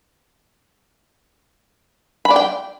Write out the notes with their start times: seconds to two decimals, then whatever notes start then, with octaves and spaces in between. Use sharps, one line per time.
2.25 B5
2.31 D5
2.36 G5